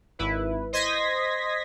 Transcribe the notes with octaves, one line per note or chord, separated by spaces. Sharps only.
G#1 E4 B4
C5 D#5 C6 G#6 A#6 B6